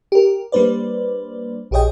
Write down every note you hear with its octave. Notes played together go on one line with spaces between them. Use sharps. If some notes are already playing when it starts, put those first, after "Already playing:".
G4 A#4
G3 A#3 D4 B4 C5 D5
A#1 G4 G#4 C#5 D#5 G5